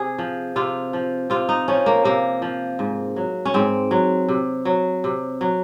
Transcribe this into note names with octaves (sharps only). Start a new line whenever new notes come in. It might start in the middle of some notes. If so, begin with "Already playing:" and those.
Already playing: C3 G#4
F3
C3 F4
F3
C3 F4
D#4
F3 C#4
A#3
C3 A#3
F3
G#2
F#3
C#4
G#2 C4
F#3
C3
F#3
C3
F#3